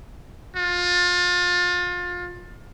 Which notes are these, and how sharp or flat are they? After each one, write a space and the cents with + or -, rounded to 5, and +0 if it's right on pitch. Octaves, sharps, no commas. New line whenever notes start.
F4 +30